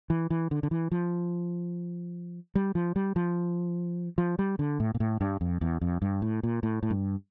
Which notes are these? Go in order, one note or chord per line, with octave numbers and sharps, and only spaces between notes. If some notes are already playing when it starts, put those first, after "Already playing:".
E3
E3
D3
D3
E3
F3
G3
F3
G3
F3
F3
G3
D3
A2
A#2
A2
G2
F2
E2
F2
G2
A2
A#2
A2
A2
G2